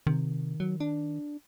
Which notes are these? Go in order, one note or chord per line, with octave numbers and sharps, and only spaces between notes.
C3 D#3
F#3
D4